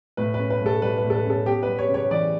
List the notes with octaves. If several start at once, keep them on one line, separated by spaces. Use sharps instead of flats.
A2 B4
B4
C#4
B4
A2 A4
G3 B4
B4
A2
A4
B4
C#4 A4
B3 G4
G3 B4
C#5
C#3 C#5
E3 D5